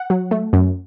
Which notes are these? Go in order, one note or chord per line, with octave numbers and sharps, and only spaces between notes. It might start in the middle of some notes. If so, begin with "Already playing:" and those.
Already playing: F#5
F#3
A3
F#2